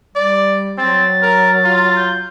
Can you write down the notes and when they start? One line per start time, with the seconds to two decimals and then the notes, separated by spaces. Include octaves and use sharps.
0.16 G3 D5
0.78 F#3 C4 A6
1.22 A#4
1.64 F4
1.97 G6